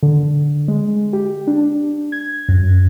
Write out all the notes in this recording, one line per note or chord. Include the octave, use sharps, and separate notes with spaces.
D3
G#3
G4
D4
G#6
F#2